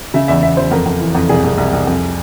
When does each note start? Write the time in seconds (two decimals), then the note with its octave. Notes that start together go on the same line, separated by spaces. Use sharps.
0.14 C#3 E5
0.28 E2 E5
0.42 E2 E5
0.57 E2 C5
0.71 F2 A#4
0.86 F2
1.00 E3
1.15 F2
1.29 C2 G#4
1.44 C2
1.58 C2
1.73 C2
1.87 F2